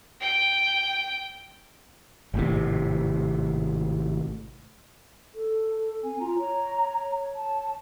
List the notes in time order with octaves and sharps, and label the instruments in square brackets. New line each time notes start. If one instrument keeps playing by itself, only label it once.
[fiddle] G5
[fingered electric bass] G#1 A2 C3
[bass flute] A4
[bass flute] C4 [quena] G#5
[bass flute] F4 [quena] A#5
[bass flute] C#5
[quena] A5